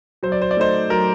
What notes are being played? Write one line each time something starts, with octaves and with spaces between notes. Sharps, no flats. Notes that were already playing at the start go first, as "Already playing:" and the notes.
F#3 C5
D5
C5
D5
A3 D#4 C5
F#3 A#4